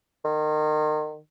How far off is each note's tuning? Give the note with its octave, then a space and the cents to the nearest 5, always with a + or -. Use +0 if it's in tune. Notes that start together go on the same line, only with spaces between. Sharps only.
D#3 -30